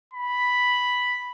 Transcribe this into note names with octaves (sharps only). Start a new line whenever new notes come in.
B5